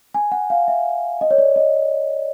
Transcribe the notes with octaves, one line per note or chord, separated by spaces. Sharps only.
G#5
F#5
F5
E5
D#5
C#5
D5
D#5